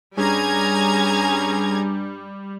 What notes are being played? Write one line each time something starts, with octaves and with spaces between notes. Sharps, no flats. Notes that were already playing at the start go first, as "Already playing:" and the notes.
G2 G3 C#4 G#4 G#5 A#5 G#6